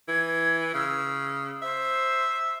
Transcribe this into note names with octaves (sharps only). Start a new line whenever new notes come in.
E3 G#6
C#3 E6
C5 E5